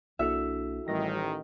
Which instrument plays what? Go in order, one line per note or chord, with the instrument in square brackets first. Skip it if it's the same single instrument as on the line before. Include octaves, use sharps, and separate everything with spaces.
[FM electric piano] B1 A#3 D4 [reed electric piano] E4 F#4 A4 [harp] E5
[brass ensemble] A1 D#3 [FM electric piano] G3 A#6